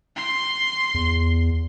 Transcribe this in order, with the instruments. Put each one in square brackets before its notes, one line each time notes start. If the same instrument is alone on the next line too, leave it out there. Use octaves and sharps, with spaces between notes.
[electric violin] C6
[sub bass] E2